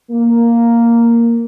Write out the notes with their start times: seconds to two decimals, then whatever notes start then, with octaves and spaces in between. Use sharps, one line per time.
0.11 A#3